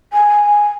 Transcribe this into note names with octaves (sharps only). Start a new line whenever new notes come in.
G#5